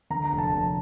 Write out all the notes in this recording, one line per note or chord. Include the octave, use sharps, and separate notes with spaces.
D3 A#5
A#5
F1
A5
F1 A5